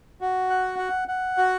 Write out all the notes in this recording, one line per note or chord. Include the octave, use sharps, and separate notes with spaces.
F#4
F#5
F#5
F#5
F#4